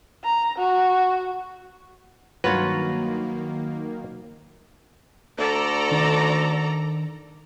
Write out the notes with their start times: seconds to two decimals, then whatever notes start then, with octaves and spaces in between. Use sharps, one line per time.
0.24 A#5
0.58 F#4
2.44 G2 D#3 F#3 A#3 F4 B4 C#5
5.38 D2 A4 D5 A#5
5.91 D#3 D4